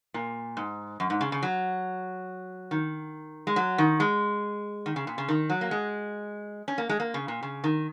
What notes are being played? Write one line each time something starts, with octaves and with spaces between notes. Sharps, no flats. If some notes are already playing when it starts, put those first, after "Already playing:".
A#2
G#2
F#2
G#2
C#3
C#3
F#3
D#3
G#3
F#3
D#3
G#3
D#3
C#3
A#2
C#3
D#3
F#3
A#3
G#3
C#4
A#3
G#3
A#3
C#3
A#2
C#3
D#3